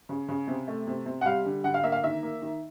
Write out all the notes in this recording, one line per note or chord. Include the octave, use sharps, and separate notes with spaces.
C#3
C#3
C3
A3
C3
C3
F#5
G3 F5
D3
D3 F#5
F5
A#3 E5
F5
D#3 E5
A#3
D#3